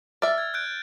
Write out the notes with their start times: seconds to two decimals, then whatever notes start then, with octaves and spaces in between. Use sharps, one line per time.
0.22 D5 E5 F6 A6
0.38 G#6
0.54 F#6 G6 D7